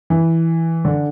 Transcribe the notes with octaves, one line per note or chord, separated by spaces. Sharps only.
E3
D3